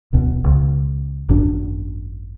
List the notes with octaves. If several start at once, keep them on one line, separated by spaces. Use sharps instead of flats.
D1 B1 B2
C#2
G#1 F#2 D4